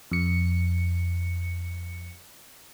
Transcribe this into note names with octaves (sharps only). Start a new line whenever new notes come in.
F2 C#7